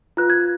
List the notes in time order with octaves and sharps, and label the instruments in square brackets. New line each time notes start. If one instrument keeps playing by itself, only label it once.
[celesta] F4 B4 F#6
G#6